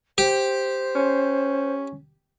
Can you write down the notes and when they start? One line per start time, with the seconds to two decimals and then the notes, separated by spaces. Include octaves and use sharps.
0.18 G4 C5
0.95 C#4